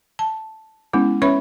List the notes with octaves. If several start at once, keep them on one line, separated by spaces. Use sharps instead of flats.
A5
G#3 B3 C#4 E4
C#4 B4 C#5 E5 B5 C#6